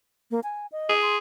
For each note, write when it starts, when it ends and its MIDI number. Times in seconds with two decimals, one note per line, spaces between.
0.31 0.40 58
0.44 0.66 80
0.72 0.94 75
0.89 1.17 68
1.02 1.17 84